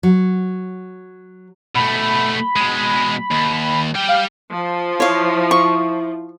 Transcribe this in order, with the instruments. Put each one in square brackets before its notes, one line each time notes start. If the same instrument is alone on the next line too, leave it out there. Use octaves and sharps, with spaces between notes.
[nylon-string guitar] F#3
[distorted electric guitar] B2 A3 [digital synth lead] B5
[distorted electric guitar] B2 G#3
D#2
G3 G5
[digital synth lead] F5
[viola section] F3
[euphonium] E4 [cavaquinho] C#5 F5
[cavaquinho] C#6